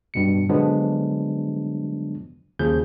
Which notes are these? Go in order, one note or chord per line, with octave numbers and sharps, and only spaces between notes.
G2 B2 C#7
D3 F3 F#3 G#3 B3 D4
D#2 C#3 F3 G#4 G6